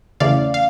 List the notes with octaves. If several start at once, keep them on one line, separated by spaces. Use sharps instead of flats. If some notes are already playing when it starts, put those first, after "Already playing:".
E2 C#3 E3 A3 C#4 D5 F5
F5